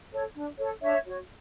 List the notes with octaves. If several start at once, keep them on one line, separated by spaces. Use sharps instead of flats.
A4 C#5
D4
A4 C#5
D4 C#5 E5
F#4 C#5